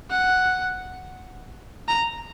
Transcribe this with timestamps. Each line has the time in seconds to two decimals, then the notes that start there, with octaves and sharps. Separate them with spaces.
0.10 F#5
1.88 A#5